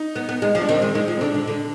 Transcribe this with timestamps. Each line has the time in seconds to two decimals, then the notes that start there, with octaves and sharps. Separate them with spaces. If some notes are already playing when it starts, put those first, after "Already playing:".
Already playing: D#4
0.16 B3
0.29 B3
0.42 G#3
0.55 F3
0.61 D4
0.69 D#3 C4
0.82 G#3
0.95 G#3 D#4
1.08 F3
1.17 C4
1.21 D3 D4
1.34 D3
1.47 D3